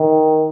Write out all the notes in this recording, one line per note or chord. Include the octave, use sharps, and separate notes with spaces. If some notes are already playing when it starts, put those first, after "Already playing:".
Already playing: D#3